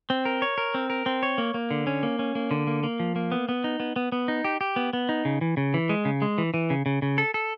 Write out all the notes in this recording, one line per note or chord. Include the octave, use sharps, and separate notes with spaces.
C4
A#4
C#5
A#4
C4
A#4
C4
C#5
A#3
A#3
D3
C#4
A#3
C#4
A#3
D3
A#3
A#3
F3
A#3
B3
B3
D#4
B3
B3
B3
D#4
G4
G4
B3
B3
D#4
C#3
E3
C#3
E3
G#3
C#3
G#3
E3
E3
C#3
C#3
C#3
A4
A4